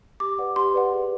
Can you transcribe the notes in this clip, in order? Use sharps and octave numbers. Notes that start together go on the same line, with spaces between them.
G4 D6
B4 D5 F#5
G4 C6
B4 D5 F#5
G#4